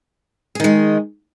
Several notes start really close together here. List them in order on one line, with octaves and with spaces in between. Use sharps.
G#4 D#3 G#3